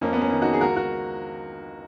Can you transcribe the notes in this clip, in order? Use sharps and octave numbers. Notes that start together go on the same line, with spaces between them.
F2 A#3 C#4
B3
A#3 C#4
D#3
D#4 F#4
G#4
C#2 F#4 A#4
F#4 A#4